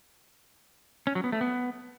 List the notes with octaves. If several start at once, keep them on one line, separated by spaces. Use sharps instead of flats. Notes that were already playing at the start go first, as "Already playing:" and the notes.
C#4
F#3
B3
A3
B3